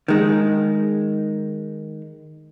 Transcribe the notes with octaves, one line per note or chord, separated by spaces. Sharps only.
D#3 G#3